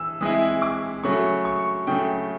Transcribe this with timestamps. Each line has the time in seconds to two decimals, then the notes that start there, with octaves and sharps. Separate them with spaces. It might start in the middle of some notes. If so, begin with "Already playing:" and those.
Already playing: E3 E6
0.21 E3 G#3 C4 E4 D#6
0.62 D6
1.04 C#3 F#3 A3 C#6
1.45 C#6
1.87 C#3 F#3 A3 G5